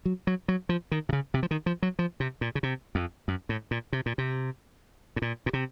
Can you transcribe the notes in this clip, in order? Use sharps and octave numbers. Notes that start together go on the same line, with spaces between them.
F#3
F#3
F#3
F3
D#3
C3
C#3
C3
F3
D#3
F3
F#3
F3
C3
A#2
C#3
C3
F2
F#2
A2
A#2
C3
A#2
C3
A2
A#2
A#2
C3